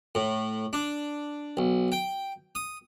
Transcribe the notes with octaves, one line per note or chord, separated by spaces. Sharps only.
A2
D4
B1
G5
D#6